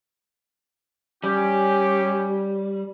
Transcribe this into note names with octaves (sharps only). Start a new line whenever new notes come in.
G3 C#4 G4